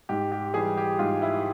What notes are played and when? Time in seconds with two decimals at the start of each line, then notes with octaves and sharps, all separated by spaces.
0.09 G#2 G4
0.32 G4
0.54 E3 G3 G#4
0.77 G4
0.99 G#2 F4
1.22 E4